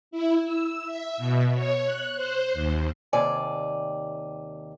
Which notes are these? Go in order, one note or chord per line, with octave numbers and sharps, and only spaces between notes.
E4
E6
E5
B2
C#5
F#6
C5
D#2
D#2 C3 D5 G#5